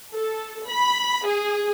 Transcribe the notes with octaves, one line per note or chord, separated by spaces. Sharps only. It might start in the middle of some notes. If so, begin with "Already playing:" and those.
A4
B5
G#4